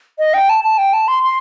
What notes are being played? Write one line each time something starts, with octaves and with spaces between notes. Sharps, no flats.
D#5
G5
A5
A5
G5
A5
C6
C6